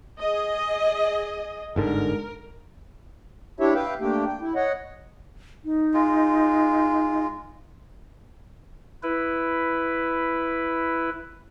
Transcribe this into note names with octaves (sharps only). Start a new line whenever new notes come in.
G#4 D#5
G1 G#2 D3 A#4
D4 E4 G4 C#5 E5
B4 E5 F5 G5
A3 A#3 D4 G4 G5
G5
E4
C#5 D#5 F#5
D#4
G#3 F4
E4 B4